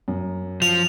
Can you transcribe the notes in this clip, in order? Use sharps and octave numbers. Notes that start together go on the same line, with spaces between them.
F#2
F3 F7